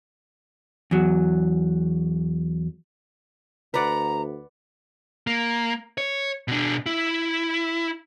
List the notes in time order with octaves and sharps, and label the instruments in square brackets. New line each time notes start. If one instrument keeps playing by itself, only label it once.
[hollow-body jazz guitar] E2 F#3
[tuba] D2 [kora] B4 D5 F#5 [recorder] A#5
[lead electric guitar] A#3
C#5
B2 D4
E4